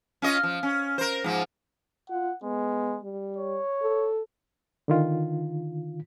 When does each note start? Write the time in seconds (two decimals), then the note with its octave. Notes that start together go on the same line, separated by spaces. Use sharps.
0.22 C#4 F4 D#5
0.43 F3
0.63 C#4
0.98 A#4 C5
1.24 G#2 F3
2.10 F4 F#5
2.43 G#3 B3
3.03 G3
3.37 C#5
3.82 A4
4.88 D3 D#3 F4